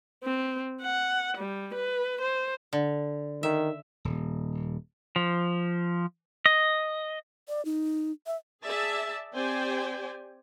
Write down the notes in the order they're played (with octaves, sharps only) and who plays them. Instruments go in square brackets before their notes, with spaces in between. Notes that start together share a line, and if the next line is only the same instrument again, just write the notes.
[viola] C4
F#5
G3
B4
C5
[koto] D3
[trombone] D#3 [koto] E5
[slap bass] D#1
[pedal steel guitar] F3
D#5
[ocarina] D5
D#4
E5
[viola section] G#4 D5 E5 A5
C4 G4 C5 D5 G5 G#5